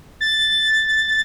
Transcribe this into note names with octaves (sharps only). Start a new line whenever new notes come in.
A6